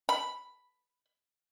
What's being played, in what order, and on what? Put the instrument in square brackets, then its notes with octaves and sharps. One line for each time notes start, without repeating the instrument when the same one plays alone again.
[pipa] B5